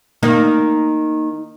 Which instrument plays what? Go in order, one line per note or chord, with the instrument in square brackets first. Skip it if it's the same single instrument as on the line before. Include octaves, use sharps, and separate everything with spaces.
[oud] D#3 A#3 D#4